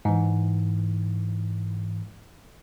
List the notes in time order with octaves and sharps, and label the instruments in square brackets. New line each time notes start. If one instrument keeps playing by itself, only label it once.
[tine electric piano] G#2 E3